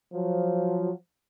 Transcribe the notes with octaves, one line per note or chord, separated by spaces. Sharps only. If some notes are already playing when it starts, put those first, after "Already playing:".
F3 F#3